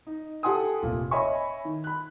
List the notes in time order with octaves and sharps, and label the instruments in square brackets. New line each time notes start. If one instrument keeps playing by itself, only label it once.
[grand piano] D#4
G4 A4 F#5 G#5 C6 D#6
F1 A#2
C#5 D#5 E5 G#5 B5 C#6
D#3
B5 F#6